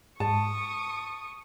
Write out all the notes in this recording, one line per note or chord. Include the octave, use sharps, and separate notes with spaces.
G#2 A5 C#6 D#6